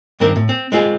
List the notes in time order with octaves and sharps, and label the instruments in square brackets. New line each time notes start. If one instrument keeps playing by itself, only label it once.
[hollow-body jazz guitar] G2 D#3 C4 A#4
A2
C4
G#3 C4 F4 G#4